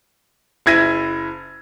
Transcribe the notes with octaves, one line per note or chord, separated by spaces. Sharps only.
F#1 E4 G#6 A#6 D#7